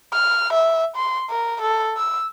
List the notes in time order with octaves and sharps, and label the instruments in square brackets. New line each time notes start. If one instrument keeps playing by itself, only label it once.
[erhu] F6
E5
C6
A#4
A4
E6